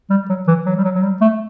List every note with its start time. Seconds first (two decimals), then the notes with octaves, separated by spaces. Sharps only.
0.10 G3
0.29 F#3
0.48 E3
0.66 F#3
0.76 G3
0.84 F#3
0.95 F#3
1.03 G3
1.21 A3